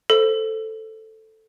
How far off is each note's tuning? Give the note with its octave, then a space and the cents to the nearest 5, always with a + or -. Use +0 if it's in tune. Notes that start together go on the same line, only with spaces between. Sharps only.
A4 +0 C5 +0